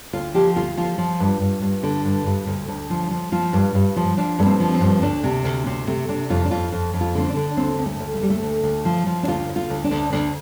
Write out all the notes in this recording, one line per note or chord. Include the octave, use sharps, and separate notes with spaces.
D2 F4
F3 G4
D2 F4
F3 F4
F3
G2
G2
G2
D3
G2
G2
D2
D2
F3
F3
F3 F4
G2
G2
F3
F3 D4
G2 A3
C4
F3
C4
G2
D2 D4
C3
D2
C3
C3 A3
C3 D4
F2 F4
D4
F2 F4
F2
F2
F4
D3 C4
D4
D3
D2 C4
D2
A3
D2
A3
D2 G3
A3
D2
D2
F3
F3
D4
D2 F4
D2
F4
D2
D4
D2
D2 D4